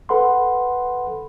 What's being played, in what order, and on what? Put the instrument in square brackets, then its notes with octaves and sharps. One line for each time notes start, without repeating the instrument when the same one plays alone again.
[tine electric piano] A4 B4 F#5 B5 C6